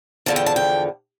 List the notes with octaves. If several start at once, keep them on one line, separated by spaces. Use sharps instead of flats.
E2 D3 F3 A5
G5
A5
G5